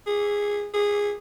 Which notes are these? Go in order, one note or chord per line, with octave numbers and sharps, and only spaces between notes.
G#4
G#4